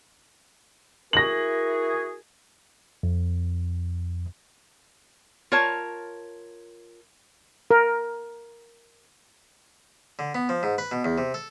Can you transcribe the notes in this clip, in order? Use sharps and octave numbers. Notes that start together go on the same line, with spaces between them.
E4 F#4 G#4 A#4 A#6 F#7
F2
F4 A#4 C#5 A5
A#4
D3
B3
F3
G#2
B4
B2
E2
C3
A4